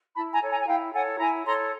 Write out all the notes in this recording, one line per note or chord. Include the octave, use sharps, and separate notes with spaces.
E4 A5 B5
G#5 A#5
A4 C#5
G#5 A#5
G#5
E4 F5 G5
A4 C#5 F#5 G#5
E4 G#5 A#5
A4 C#5 A#5 C6